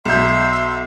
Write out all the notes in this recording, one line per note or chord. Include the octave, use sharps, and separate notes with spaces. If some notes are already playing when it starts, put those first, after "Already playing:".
B1 E5 C6 G6